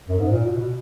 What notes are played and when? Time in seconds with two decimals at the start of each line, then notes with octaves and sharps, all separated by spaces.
0.09 F#2
0.19 G#2
0.31 A#2
0.45 B2
0.59 B2